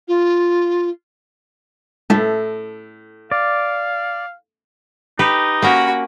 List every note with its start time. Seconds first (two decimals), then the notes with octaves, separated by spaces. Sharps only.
0.08 F4
2.10 A2 A4 E5
3.31 D5 F5
5.19 D#4 G4 B4
5.62 A#3 C#4 F#4 A#4 B5